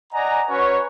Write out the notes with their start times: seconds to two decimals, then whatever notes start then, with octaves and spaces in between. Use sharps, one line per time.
0.13 D5 D#5 F#5 G#5 A#5
0.49 C#4 F#4 B4 C#5